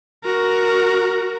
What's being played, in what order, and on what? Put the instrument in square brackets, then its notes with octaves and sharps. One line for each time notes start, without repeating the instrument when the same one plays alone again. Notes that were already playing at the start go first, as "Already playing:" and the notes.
[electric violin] F#4 A#4